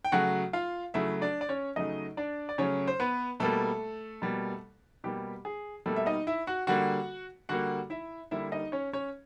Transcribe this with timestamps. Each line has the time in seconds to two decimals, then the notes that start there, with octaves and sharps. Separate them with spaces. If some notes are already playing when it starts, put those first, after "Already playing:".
0.05 G5
0.12 C#3 F#3 A3 F#4 F#5
0.53 F4 F5
0.94 C#3 F#3 A3 E4 E5
1.21 D4 D5
1.41 D5
1.49 C#4 C#5
1.76 C#3 F#3 A3 D#4 D#5
2.17 D4 D5
2.49 D5
2.58 C#3 F#3 A3 C#4 C#5
2.87 C5
3.00 B3 B4
3.40 B2 G3 A3 A#3 A4
4.22 B2 G3 A#3
5.04 B2 G3 A#3 G4
5.45 G#4
5.86 B2 G3 A3 A#3 A4
5.96 E5
6.06 D#4 D#5
6.27 E4 E5
6.47 F#4 F#5
6.67 D3 G3 A#3 F#4 F#5
7.49 D3 G3 A#3 F#4 F#5
7.90 E4 E5
8.31 D3 G3 A#3 E4 E5
8.52 D#4 D#5
8.72 C#4 C#5
8.93 C#4 C#5